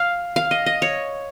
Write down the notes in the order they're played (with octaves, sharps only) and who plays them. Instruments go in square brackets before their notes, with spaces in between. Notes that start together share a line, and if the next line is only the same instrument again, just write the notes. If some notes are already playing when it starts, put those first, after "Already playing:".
Already playing: [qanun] F5
F5
D#5
D#5
C#5